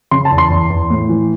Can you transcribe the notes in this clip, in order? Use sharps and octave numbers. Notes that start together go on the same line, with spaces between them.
C#3 C6
A5
E2
C6
E2
E2
A2
E3